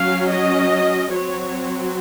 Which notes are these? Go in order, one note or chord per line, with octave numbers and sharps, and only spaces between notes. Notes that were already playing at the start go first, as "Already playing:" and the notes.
Already playing: F#3 C#4 F5
D#5
F#3 C4 C#5